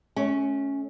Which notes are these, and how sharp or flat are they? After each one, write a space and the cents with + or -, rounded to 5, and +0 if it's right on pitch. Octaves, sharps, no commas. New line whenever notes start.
A3 -35 C#4 +0